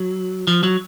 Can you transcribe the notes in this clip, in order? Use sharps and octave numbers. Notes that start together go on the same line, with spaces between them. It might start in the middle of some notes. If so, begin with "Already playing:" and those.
Already playing: F#3
F3
F#3